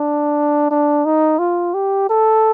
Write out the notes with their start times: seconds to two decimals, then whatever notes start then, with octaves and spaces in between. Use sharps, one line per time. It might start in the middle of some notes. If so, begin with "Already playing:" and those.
Already playing: D4
0.71 D4
1.05 D#4
1.39 F4
1.74 G4
2.09 A4